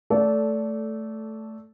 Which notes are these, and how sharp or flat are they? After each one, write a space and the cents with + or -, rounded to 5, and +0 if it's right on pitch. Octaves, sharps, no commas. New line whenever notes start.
A3 +0 A4 -10 D5 -25